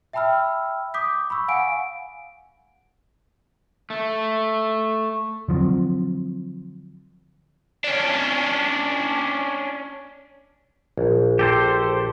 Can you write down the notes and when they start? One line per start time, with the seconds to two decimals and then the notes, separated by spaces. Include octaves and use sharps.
0.13 E5 G5 A5 B5 E6 F6
0.94 D6 D#6 G6 B6
1.30 B5 C#6 E6
1.48 F5 F#5 G#5 D7
3.90 A3
5.48 D3 F3 F#3 C4
7.84 C#4 D4
10.98 A#1
11.39 G4 A4 C5